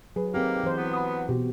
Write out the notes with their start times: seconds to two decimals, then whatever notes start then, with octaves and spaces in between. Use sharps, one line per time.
0.16 F#3 G#4 B4
0.34 D#3 A#3 C4 D#4 G4
0.63 E3 C5
0.76 F#3 B3
0.93 B5 D#6
1.29 B2 F#4 G4